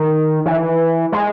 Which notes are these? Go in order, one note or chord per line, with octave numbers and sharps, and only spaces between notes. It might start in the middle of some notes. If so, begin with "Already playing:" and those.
Already playing: D#3
E3
G#3